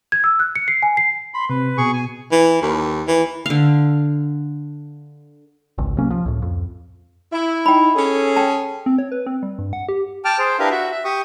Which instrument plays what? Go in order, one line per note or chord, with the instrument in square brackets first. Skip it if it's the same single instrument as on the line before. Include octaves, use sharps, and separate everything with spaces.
[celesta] G#6
E6
F#6
C#7
C7
G#5
C7
[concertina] B5 [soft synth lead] C6
[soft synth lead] C3 [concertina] B4
[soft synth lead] B2 [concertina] G#4 C#6
[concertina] G#5
[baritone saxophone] E3
D#2
E3
[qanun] D3 F5
[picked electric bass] G#1 C#2
C3 F#3 A#3 C#4
F3
C#2 A2
F2
[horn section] E4
[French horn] D#4 [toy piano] G5 B5
[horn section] C#4 G#4 [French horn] A4
[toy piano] G5 A5
[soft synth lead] C4
C#5
B4
C4
G3
G2
F#5
G4
[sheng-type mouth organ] G5 A5 D6 F6
G#4 C5
D4 E4 G4 A#4 B4 F5
F#4 E5
E5
G4 C#6 D#6